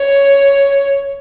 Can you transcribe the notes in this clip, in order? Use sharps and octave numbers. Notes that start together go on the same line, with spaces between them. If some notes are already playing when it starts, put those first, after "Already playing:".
Already playing: C#5